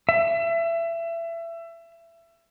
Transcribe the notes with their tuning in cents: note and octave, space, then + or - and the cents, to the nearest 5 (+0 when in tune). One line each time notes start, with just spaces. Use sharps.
E5 +25